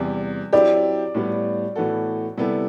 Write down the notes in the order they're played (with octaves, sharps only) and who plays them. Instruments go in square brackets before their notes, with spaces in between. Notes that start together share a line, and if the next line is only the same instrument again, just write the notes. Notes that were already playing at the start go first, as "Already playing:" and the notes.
Already playing: [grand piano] E2 C3 G3
[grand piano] F#3 C4 E4 G4 [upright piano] D5
[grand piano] A2 G3 B3
A2 E3 B3 F#4 A4
C3 G3 B3 E4 A4